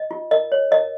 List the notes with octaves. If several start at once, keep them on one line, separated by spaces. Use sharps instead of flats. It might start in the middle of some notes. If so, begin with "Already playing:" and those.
Already playing: D#5
F4
A#4 D#5
C#5
A#4 D#5